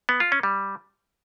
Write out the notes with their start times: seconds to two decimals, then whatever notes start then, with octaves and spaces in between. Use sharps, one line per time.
0.09 B3
0.20 F4
0.32 C#4
0.43 G3